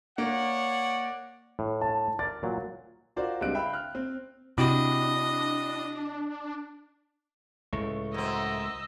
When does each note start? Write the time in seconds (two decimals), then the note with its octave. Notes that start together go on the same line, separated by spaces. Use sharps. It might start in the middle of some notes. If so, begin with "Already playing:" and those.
0.18 A#3 C#5 D5 F#5
1.59 A2
1.81 A5
2.19 A#4 D5 A6
2.43 A#2 F#3
3.16 F4 F#4 A#4 C5 D5
3.41 C#2 G3 C4 D4 F#6 D7
3.55 E5 F5 G5 B5
3.73 F6 F#6
3.95 C4
4.58 C3 D4 E4 F#4 D#5 G5
7.73 C#2 A2 A3 C#6
8.14 F#2 C4 D#5 E6